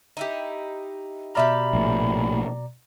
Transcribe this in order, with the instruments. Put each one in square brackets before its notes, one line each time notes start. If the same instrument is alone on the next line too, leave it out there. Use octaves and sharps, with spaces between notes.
[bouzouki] D#4 E4 G4
[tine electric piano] B2 D5 A#5 [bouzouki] G4 E5 F5 [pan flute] B5
[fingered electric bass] A#1 A2